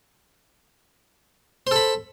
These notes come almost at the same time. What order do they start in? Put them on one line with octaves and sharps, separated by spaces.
C5 A4 B5